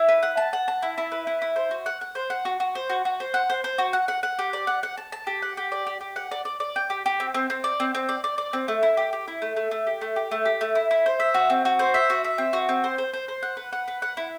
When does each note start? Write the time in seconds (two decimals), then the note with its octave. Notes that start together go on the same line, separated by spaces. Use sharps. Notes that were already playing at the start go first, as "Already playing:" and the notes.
Already playing: E4
0.09 B4
0.23 F#5
0.37 A5
0.53 F#5
0.68 A5
0.82 E4
0.98 E4
1.12 B4
1.27 E4
1.42 E4
1.56 C5
1.71 F#4
1.86 F#5
2.01 F#5
2.15 C5
2.30 F#5
2.45 F#4
2.60 F#4
2.75 C5
2.89 F#4
3.05 F#4
3.20 C5
3.34 F#5
3.50 C5
3.64 C5
3.78 F#4
3.93 F#5
4.08 F#5
4.23 F#5
4.39 G4
4.53 D5
4.67 F#5
4.83 F#5
4.98 A5
5.12 A5
5.27 G4
5.42 F#5
5.57 G4
5.72 D5
5.87 G4
6.01 G4
6.16 F#5
6.31 D5
6.45 D5
6.60 D5
6.76 G5
6.90 G4
7.06 G4
7.20 C4
7.34 C4
7.50 C4
7.64 D5
7.80 C4
7.95 C4
8.09 D5
8.24 D5
8.38 D5
8.53 C4
8.68 A3
8.83 E4
8.97 G4
9.13 G4
9.28 E4
9.42 A3
9.56 A3
9.71 A3
9.87 G4
10.01 A3
10.16 G4
10.31 A3
10.45 G4
10.61 A3
10.75 E4
10.91 E4
11.06 C5
11.20 E5
11.34 F#4
11.50 C4
11.65 F#4
11.79 C5
11.94 E5
12.10 F#4
12.24 E5
12.38 C4
12.53 F#4
12.69 C4
12.84 C5
12.98 C5
13.13 C5
13.28 C5
13.43 F#5
13.57 B4
13.73 F#5
13.88 B4
14.02 F#5
14.17 E4